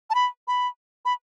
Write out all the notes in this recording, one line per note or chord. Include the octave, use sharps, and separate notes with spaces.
A5
B5
B5
B5